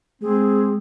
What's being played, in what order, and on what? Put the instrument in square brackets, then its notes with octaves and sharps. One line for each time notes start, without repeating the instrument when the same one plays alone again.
[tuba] G#3 [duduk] C4 [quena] G#4